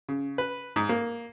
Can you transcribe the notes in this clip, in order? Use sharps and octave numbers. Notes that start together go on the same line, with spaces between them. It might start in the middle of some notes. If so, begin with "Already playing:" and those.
C#3
B4
G#2
A#3